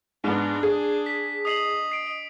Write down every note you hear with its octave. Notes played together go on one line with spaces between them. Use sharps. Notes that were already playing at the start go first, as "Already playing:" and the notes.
G#2 B3 D4
G#4
B6
D#5 D#6 C7 F#7
C7 D7